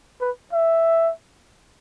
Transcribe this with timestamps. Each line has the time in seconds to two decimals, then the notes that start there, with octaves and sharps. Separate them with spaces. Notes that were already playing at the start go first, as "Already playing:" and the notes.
0.21 B4
0.53 E5